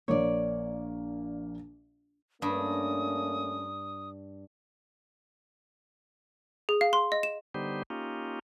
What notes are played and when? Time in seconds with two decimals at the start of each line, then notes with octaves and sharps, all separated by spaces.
0.08 A#1 A#3 C#5 D5
2.42 G2 A3 A#3 C#4 D#6
6.69 G#4
6.81 F5
6.93 C6
7.12 D#5
7.23 E7
7.54 D3 G3 B3 D#4 G4 C5
7.90 A#3 C#4 D#4 F4 G4